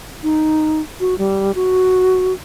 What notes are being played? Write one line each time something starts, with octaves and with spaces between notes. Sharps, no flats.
D#4
F#4
G3
F#4